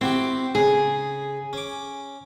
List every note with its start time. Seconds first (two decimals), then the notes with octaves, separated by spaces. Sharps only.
0.01 C4 E4 F#4 G4
0.55 C#3 G#4
1.53 C#4 D6